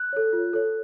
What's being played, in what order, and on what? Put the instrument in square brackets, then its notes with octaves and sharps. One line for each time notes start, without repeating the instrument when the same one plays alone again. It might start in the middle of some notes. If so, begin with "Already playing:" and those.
Already playing: [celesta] F#6
A4 C#5
F4
A4 C#5